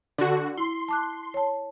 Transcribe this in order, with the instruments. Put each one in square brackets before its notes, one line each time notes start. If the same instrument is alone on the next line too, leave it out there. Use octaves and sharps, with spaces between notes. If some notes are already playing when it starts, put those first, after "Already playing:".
[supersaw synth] D3 F#4
[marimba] E4 [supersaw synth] C6
[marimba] A5 D6 F#6
C#5 A5